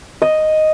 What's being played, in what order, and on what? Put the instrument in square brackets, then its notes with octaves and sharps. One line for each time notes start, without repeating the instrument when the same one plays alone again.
[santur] D#5